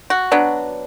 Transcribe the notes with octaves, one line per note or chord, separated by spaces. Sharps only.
F#4
F#3 B3 D4